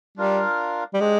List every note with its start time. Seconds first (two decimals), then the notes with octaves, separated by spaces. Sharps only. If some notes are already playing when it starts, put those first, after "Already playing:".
0.18 G3 D4 F4 A#4 F5
0.94 G3
1.00 G#3 D4 G4 C5